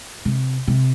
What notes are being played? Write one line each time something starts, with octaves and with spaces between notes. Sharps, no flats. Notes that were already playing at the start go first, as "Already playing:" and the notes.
C3
C3